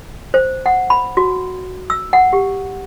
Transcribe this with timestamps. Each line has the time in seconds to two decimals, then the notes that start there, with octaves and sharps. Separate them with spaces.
0.34 C5
0.66 F#5
0.90 B5
1.17 F#4
1.90 E6
2.13 F#5
2.33 G4